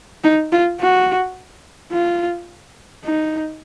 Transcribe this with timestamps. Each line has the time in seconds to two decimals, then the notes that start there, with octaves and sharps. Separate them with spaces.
0.24 D#4
0.52 F4
0.80 F#4
1.92 F4
3.05 D#4